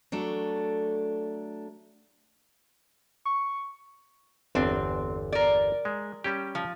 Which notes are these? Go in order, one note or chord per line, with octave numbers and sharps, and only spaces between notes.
F#3 A3 D4 A4
C#6
G1 E2 C4 D4
A#4 D5
G#3
G3 C#4 G4
F3